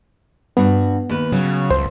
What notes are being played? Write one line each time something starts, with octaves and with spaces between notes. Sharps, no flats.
G2 B3 F#4
D#2 B4
C#3 F#3
C#2 C5